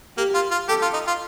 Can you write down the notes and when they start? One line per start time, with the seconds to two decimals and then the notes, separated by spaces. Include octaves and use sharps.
0.17 A#3 G4
0.34 F4
0.51 F4
0.68 G4 A4
0.82 F4
0.94 D#4
1.07 F4